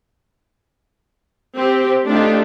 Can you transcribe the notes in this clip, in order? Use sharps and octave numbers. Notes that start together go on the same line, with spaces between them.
C4 G4
A3 D4 D#4 F4 G4